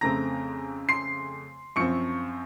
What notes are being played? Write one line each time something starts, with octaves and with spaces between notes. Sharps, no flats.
F2 C#3 A3 C4 A#5 A#6
C6 C7
F#2 F3 C4 C#6 C#7